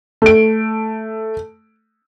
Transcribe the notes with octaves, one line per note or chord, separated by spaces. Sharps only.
A3 D7